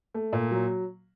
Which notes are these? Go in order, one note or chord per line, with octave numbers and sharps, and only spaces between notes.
A3
A#2
F#3